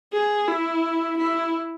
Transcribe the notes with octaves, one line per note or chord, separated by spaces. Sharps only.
G#4
E4
E4